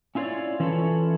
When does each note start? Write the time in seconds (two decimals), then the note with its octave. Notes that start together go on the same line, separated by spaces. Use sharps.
0.15 C#4 E4 F4 B4 C#5 D5
0.60 E3 C#4 E4 F4 A4 C#5